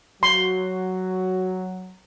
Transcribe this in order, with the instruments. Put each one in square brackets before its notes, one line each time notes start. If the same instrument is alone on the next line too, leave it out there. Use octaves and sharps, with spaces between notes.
[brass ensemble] F#3 [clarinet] F#4 [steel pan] C6